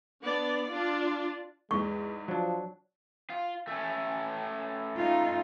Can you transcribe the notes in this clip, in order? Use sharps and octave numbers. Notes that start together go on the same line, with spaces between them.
B3 D4 D5
D4 F4
E2 G#2 E3 G#3 C#6
F3 F#3 D4
F4
A3 C#4
D#4 F4